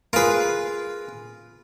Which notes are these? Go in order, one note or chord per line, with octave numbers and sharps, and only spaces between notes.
F4 G#4 A#4 B4